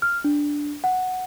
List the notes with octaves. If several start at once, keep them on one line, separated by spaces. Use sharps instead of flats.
F6
D4
F#5